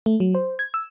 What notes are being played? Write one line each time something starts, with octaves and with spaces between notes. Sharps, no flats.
A3
F#3
C5
G#6
E6